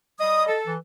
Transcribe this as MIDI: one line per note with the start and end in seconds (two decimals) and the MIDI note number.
0.20 0.46 55
0.20 0.55 75
0.20 0.46 87
0.49 0.73 69
0.67 0.77 52